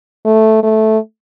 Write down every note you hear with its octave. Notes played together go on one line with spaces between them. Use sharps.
A3
A3